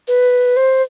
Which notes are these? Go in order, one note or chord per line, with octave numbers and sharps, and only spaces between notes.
B4
C5